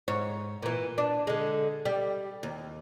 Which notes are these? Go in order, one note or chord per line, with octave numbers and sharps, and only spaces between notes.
G#2 C#5
A#2 E3
D4
D3 G#3
G3
D#2